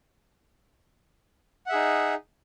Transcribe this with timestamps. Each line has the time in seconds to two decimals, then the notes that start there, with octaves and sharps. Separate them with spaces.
1.66 F#5
1.69 E5
1.72 G#4
1.75 D#4